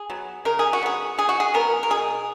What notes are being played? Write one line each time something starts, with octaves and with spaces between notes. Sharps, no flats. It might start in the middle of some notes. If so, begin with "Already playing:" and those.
Already playing: G#4
F#3 B3
C#3 A#4
G#4
F#4
F#3 B3 G#4
C#3 G#4
F#4
G#4
F#3 B3 A#4
A#4
B2 G#4